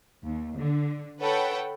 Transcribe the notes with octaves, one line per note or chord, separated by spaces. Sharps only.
D#2
D3
A4 B4 C#5 F#5 G5